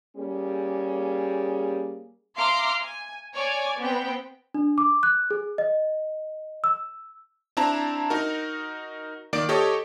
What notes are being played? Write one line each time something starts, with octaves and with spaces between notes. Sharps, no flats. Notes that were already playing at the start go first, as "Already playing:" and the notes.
G3 A#3 C#4 G#4
E5 F5 A#5 C6 D6 F6
G#5
C#5 D5 G#5 D6
B3 C4 G5
D4
D6
F#6
G#4
D#5
E6
C4 D4 E4 A5 A#5
D#4 F#4 A#4
D#3 A#3 D5 D6 D7
G4 A4 C#5 D#5